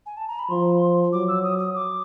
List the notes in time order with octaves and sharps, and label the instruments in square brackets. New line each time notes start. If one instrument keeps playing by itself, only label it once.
[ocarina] G#5
A5
A#5
B5
[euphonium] F3 [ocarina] C6
[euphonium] F#3 [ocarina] D6
[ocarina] E6
D#6
D#6
D6